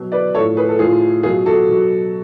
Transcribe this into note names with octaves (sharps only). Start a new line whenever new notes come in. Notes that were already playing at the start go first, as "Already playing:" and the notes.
Already playing: B2 F#3
B4 D5
A2 F3 A4 C#5
G#4 B4
A4
A2 F3 F4 G#4
B2 F#3 F4 G#4
F#4 A4
B2 F#3